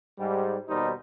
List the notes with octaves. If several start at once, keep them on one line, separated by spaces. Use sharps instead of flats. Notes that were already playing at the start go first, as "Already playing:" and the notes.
G#2 G3
D#2 B2 G3 D#4 C5